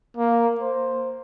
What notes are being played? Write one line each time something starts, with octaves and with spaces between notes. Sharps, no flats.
A#3
C5